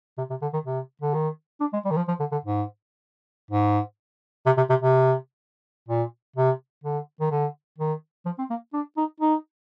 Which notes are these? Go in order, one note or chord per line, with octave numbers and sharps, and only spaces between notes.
C3
C3
D3
D#3
C3
D3
D#3
D4
G#3
G3
D#3
F3
F3
D3
D3
G#2
G#2
C3
C3
C3
C3
A#2
C3
D3
D#3
D3
D#3
F3
C4
A#3
D4
D#4
D#4